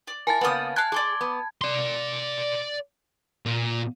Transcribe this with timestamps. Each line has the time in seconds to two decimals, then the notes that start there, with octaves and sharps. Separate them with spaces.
0.07 D5
0.27 E4 A#4 G#5 A5 A6
0.41 C#3 A#3 B3 D5 D#6
0.76 F5 A5 F#6 G#6
0.92 G#4 D5 C6 D6
1.21 B3
1.62 D5 C6
3.46 A#2